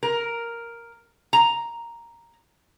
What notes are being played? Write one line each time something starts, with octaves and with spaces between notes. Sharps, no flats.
A#4
A#5